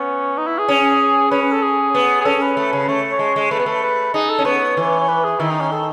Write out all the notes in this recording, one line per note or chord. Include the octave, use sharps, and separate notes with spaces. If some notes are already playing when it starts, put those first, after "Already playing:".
Already playing: B3 C#4
D#4
E4
G#4
C#4
C#4 B4
B4
A4
G#4
B3
G#4
C#4 A4
B4
A3
C#3
A3 C#5
C#5
G#3
G#3
A3 B4
B3
A3
B4
D#4 G#4
A4
C#4
B3 C#5
E3
C#5
B4
G#4
D#3 E4
D#4
C#4
A4